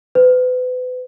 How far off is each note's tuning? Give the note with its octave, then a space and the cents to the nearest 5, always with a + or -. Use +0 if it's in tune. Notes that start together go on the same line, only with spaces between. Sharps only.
B4 +35